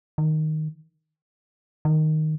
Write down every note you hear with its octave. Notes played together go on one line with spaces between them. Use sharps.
D#3
D#3